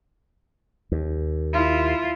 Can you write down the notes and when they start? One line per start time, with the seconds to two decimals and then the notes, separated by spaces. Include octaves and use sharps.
0.92 D#2
1.53 E4 F4